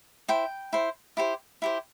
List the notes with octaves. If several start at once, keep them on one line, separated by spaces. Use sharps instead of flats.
E4 C5 G5
E4 C5
E4 G4 C5
E4 G4 C5